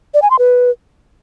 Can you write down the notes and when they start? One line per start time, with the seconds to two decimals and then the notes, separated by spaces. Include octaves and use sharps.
0.14 D5
0.22 G#5
0.31 C6
0.39 B4